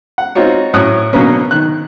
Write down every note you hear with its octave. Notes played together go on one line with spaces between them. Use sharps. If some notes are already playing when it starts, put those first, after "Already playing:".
F#5
C4 D#4 F4 F#4 C#5
A2 F#3 C#4 C#5 D#6 F#6
B2 D3 F#3 A#3 B3 C#4
D#3 F#6